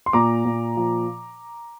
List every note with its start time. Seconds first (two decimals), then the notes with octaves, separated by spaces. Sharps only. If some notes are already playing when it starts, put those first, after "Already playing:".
0.06 C6
0.13 A#2 A#5 D6
0.45 A#2
0.77 F3